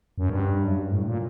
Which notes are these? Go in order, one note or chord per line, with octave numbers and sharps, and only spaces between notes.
F#2
G2
F#2
G2
A2
A#2